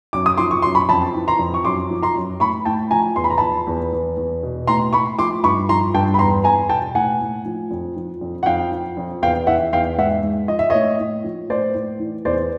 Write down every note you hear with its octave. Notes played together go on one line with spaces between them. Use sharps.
F#2 D6
D#6
F3 C6 D6
C#6
F#2 C6
B5 C#6
F2 A5 B5
E3
A#5 C6
F2
C#6
F#2 C6 D6
F3
A#5 C6
F#2
A2 B5 C#6
A2 G5 A5
F3 G#5 A#5
E2 C6
B5
A#5
F3 A5 B5
E2
E2
E2
B2
A2 A#5 C6
A2 B5 C#6
F3 C6 D6
G2 B5 C#6
F3 A#5 C6
G2 G5 A5
B5
E2 A#5 C6
E2 G#5 A#5
B2 G5 A5
A2 F#5 G#5
A2
F3
F2
F3
F2
F#5
F2 F5 G5
F3
F2
E2 F5 G5
E3 E5 F#5
E2 F5 G5
G#2 E5 F#5
G#2
F3 D#5
E5
A2 C#5 D#5
A2
F3
A2 C5 D5
A2
E3
E2 C5 D5